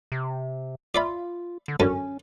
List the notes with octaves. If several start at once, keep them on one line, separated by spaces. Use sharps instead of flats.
C3
F4 D5 E5 B5
D3
F#2 D3 C#4